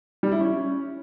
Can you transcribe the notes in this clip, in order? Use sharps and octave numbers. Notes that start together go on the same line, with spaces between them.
G3
E4
C#4